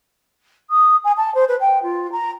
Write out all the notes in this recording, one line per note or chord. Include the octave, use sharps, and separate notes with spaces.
D#6
G#5
A5
C5
B4
G5
F4
A#5